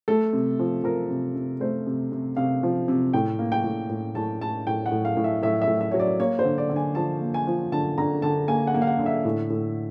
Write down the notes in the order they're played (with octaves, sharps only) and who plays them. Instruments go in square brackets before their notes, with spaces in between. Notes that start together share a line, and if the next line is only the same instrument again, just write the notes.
[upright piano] A3 A4
C3
F3
F3 A#4
C3
C3
A3 C5
C3
C3
C3 F5
F3
C3
A2 G5
A#3
G5
A2
A2
A2 A5
A2 A5
A2 G5
F#5
A2
F5
A2
E5
A2 E5
E5
A2
E5
F#3 C#5
D5
A#3 C#5
C5
D3
D5
D3
G#5
F3 A5
A#3
G#5
F3
D3 A5
D3 A#5
D3 A5
A#3 G#5
F#5
A#3
F5
F#5
D3
E5
A2
A2